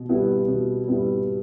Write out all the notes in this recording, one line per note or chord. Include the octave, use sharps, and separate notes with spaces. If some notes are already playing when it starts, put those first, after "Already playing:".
Already playing: B2
G3 B3 E4
B2
G3 B3 E4